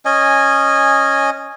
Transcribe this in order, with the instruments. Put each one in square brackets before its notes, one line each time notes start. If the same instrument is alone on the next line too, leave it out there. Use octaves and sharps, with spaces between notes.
[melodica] C#4 D#5 G#5